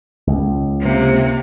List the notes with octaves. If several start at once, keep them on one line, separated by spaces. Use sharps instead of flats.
C#2
C3 A#3